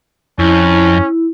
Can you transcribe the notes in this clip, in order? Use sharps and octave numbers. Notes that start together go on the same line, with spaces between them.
F2 C#4 E4